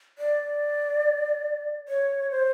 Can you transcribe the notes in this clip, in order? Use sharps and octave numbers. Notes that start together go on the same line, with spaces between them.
D5
C#5
C5